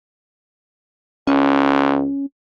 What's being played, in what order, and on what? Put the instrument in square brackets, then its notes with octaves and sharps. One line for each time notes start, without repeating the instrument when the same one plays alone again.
[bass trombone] C#2 [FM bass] C#4